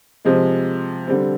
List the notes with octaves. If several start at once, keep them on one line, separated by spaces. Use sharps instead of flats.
C3 F3 G#3
D3 G3 C4